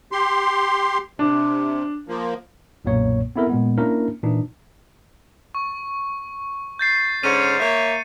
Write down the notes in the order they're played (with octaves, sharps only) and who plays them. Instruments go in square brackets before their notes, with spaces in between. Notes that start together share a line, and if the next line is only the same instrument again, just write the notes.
[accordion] G4 C6
[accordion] C3 [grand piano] D4
[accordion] F3 A#3
[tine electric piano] B1 F#2 A#2 A#3 C#5
B3 C4 E4 A4 A#4
A#2 G#3 B3
A#3 C#4 D4 E4 A#4
A#2 E3 D4 D#4
[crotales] C#6
G6 A6 C7
[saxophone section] G#2 D3 C#4 [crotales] C#7 D#7
[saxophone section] A#3 C#5 E5